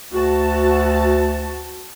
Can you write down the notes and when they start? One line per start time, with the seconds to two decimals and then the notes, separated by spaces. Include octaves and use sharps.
0.13 D2 F#4 A5